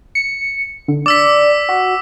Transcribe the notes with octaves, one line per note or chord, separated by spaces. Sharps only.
C#7
D3
D5 D6 E6 B6
F#4